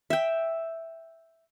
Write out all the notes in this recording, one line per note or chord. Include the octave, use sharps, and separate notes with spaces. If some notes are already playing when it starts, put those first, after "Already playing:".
E5 G5